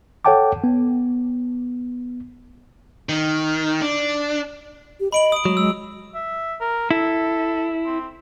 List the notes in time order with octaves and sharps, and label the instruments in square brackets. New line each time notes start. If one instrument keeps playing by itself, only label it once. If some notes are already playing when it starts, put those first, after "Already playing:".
[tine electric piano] A4 C#5 F#5 G5 A5 D6
B3
[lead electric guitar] D#3
D4
[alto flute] G4
[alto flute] D#5 [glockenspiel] B5 D7 F#7
[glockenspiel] D#6 D7
[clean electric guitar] F#3 [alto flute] G#3
[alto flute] G#3 [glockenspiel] E6
[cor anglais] E5
A#4
[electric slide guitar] E4 [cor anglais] A4
[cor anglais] C4